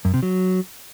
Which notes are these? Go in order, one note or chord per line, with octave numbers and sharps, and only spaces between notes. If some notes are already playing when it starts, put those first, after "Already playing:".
F#2
C3
F#3